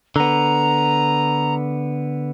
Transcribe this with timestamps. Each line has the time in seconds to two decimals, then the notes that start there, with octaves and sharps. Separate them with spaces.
0.16 D3 B3 A#5